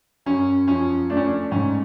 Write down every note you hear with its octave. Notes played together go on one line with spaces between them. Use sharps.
F#2 C#4
F3 C#4
A3 D4
C#4
D4
G#2 C#4